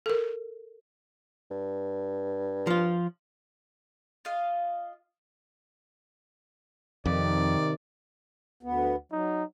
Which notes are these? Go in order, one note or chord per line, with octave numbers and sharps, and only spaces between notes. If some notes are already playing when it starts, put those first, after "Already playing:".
A4 A#4
G2
F3 F4
F4 D#5 F5
F2 C3 D#3 D5
D2 B3
F#3 D#4